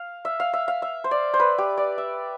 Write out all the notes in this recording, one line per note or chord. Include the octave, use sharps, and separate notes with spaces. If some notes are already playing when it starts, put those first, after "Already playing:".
Already playing: F5
E5
F5
E5
F5
E5
C5
D5
C5
B4
G4
D5
E5